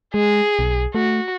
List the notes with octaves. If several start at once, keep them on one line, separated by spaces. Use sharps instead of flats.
G#3 G#4
B1
A3 F#4